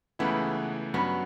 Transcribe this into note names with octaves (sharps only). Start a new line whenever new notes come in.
C#2 C#3 E3 A3 B3 E4
G2 F#3 B3 C#4